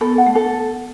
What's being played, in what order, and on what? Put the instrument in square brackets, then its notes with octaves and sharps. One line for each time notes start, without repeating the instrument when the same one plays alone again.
[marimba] B3 [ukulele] A4
[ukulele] F#5
[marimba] A3
[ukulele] A4